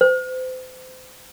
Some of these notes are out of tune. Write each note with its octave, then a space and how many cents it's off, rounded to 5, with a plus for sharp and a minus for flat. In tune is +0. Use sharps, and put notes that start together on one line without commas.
C5 -40